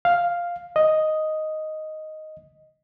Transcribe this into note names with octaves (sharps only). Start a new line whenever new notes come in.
F5
D#5